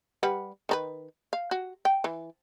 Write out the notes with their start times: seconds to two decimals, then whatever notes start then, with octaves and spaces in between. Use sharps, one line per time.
0.23 G3 B4 F#5
0.69 D#3 D4 B4
1.33 F5
1.51 F#4
1.85 G5
2.04 E3